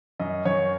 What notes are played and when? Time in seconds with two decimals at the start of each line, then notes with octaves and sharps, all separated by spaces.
0.19 F#2 D#5
0.45 F#2 C#5